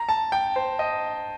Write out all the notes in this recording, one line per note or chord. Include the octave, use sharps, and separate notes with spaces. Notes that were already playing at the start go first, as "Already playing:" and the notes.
Already playing: A#5
A5
G5
C5
D#5